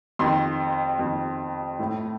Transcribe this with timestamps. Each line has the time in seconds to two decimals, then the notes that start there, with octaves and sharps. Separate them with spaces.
0.19 F2 D#3 C6
0.99 F2 D#3
1.79 A2